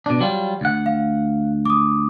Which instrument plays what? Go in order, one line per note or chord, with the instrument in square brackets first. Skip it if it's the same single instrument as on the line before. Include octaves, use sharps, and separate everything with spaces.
[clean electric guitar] B2 D4
F#3 G3 F4
D2 F#5
[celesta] F5
D6 D#6